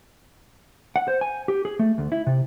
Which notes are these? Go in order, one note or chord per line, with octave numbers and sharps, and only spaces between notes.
F#5
C5
G#5
G4
G#4
A3
D2
E4
C3